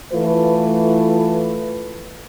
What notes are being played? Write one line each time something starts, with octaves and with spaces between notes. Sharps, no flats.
E3 A3 F4 B4